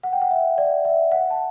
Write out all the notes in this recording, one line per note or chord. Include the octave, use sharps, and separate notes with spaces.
F#5
G5
F#5
E5
D5
E5
F#5
A5